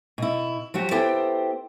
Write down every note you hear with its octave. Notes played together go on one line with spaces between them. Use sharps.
B2 E4
F3 F#3 F#4 G4
B3 E4 G4 A4 C5 G5